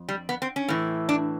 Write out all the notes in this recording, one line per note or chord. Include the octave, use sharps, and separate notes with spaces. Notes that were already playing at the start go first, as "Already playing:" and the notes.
Already playing: F2
G3
B3
C4
C#4
A2 E3
D4